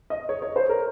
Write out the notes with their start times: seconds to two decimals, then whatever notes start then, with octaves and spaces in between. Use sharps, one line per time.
0.10 D#5
0.29 C#5
0.42 C#5
0.56 C5
0.69 A#4